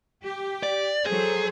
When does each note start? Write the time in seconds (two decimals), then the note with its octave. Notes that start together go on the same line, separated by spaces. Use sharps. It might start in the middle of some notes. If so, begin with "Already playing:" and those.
0.24 G4
0.63 D5
1.05 F#3 G#4 A4 C5